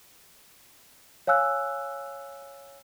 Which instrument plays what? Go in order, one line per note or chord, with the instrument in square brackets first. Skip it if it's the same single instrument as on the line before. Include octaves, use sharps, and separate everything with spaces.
[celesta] C#5 F5 G#5 E6 F#6